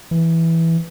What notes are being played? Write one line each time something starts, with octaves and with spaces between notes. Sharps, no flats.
E3